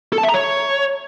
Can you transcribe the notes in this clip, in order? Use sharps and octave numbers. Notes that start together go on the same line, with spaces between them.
A4
A5
E5
A#5
C#5